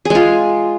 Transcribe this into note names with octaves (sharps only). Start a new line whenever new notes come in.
G#3 F4 G#4